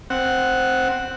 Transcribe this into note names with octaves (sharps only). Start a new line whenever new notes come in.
C4 F#5